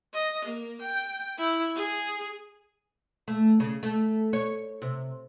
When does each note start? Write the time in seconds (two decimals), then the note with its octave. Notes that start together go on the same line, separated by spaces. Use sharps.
0.14 D#5
0.45 A#3
0.82 G5
1.39 E4
1.76 G#4
3.28 A3
3.60 C#3
3.83 A3
4.33 C#5
4.82 C3